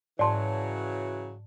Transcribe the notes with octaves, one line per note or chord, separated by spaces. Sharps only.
G#2 C#3 E3 F#3 D5 A5 C6